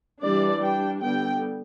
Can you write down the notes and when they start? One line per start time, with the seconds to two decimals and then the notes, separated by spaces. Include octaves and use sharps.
0.21 E3 G3 D4 D5
0.61 G3 D4 G5
1.01 D3 G3 B3 G5